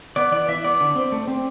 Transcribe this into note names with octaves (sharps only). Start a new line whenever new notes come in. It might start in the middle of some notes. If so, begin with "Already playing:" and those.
B3 D5
E3 D5
E3 E5
B3 D5
D3
C4
A3
C4